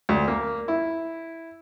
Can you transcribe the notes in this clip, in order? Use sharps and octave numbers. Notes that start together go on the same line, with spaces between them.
D2
A#3
E4